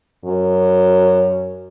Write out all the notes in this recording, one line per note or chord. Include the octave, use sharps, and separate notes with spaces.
F#2